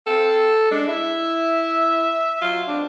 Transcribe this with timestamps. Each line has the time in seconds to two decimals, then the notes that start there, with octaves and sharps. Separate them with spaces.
0.07 C4 A4 F5
0.72 G#3 D4
0.88 E4 E5
2.42 F#3 F4
2.68 B2 G#3 C4 D4